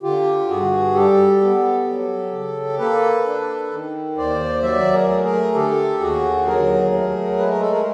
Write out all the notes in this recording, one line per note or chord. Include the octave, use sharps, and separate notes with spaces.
D3 F4 G4
G2 F#4 G#4
G3 G4 A4
B3
F#3
C#3
A#3 A4 B4
D4
D#3
D#2 C5 D5
F#3 D5 E5
G#4 A#4
A3
G#4 A#4
D3 G4 A4
D#2 F#4 G#4
F#3 G#4 A#4
A3
G#3 B4
A#4
A4
G#4 A#4